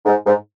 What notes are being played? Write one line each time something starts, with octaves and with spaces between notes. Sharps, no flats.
G#2
G#2